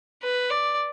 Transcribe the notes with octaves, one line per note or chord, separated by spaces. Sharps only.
B4
D5